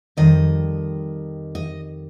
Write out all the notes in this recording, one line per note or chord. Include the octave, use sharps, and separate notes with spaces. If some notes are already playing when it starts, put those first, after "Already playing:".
F2 D#3 G3 D#5
D#5